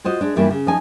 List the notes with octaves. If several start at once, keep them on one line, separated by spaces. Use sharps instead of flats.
F4 F#4 C5 D#5
G#3 D4
G2 E3 G3 A#3 E4 F4
C#3
F3 D#4 G#5